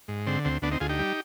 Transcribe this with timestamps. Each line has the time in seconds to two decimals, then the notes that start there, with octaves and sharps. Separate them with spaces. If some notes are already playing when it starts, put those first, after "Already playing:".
0.08 G#2
0.27 D3 C4
0.45 D2 C4
0.62 D2 B3 D4
0.71 C4 D#4
0.80 D2 F4 G#4
0.89 D#4 G4
0.99 G3